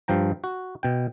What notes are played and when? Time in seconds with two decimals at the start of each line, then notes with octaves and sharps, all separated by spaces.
0.08 G2 F3 G5 A#5
0.44 F#4
0.83 B2 G5